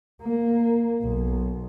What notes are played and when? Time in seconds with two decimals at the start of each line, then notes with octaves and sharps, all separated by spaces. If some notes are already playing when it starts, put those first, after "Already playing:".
0.22 A#3
1.02 B1